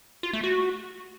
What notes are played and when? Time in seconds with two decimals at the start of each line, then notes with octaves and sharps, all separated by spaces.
0.23 F4
0.33 A3
0.44 F#4